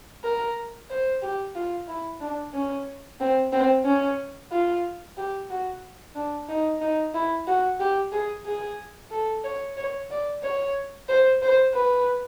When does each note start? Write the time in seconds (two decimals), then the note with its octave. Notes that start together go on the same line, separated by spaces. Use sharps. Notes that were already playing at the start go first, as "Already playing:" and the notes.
0.24 A#4
0.90 C5
1.22 G4
1.55 F4
1.88 E4
2.21 D4
2.54 C#4
3.20 C4
3.53 C4
3.85 C#4
4.52 F4
5.17 G4
5.50 F#4
6.15 D4
6.49 D#4
6.81 D#4
7.14 E4
7.47 F#4
7.80 G4
8.12 G#4
8.45 G#4
9.11 A4
9.44 C#5
9.77 C#5
10.11 D5
10.43 C#5
11.09 C5
11.42 C5
11.74 B4